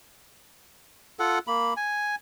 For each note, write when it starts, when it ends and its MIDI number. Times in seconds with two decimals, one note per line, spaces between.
1.20 1.39 65
1.20 1.39 69
1.20 1.39 78
1.47 1.74 58
1.47 1.74 83
1.77 2.15 80